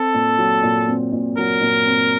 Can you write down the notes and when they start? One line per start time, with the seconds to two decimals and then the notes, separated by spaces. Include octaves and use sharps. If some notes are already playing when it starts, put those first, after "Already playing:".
Already playing: C4 A4
0.14 A#2
0.39 F#3
0.63 A#2
0.88 C4
1.12 A#2
1.38 F#3 A#4
1.62 A#2
1.86 C4